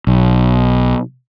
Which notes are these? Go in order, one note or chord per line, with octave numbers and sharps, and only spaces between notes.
B1